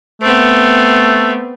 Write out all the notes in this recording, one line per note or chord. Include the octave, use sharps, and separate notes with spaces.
A3 B3 C4